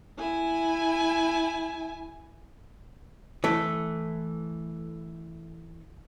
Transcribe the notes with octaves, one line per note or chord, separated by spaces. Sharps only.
E4 G#5
E3 A3